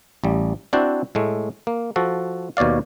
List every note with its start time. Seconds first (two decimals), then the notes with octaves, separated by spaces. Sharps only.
0.24 A1 G3
0.73 C4 D4 E4 F#4 C5 D5
1.15 A2 G#3 A3
1.67 A#3
1.96 F3 F#4 A4
2.57 D#2 B2 C#5 D5 F5